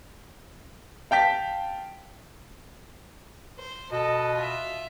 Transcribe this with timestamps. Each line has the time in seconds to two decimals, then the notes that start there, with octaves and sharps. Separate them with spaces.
1.11 F5 G5 A5 B6
3.58 C5
3.92 B2 A4 D#5
4.35 F4 E5